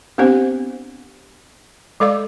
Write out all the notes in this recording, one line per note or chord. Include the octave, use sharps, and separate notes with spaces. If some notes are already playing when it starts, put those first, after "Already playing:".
B3 C4 D4 G4 C5
G#3 A4 D5 F5 D6